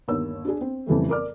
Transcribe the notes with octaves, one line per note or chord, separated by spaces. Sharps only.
G1 D#2 A#3 C#5 E6
D4 G#4
C4
F2 C#3 E3 G3 A3
A#4 D5 D6 F6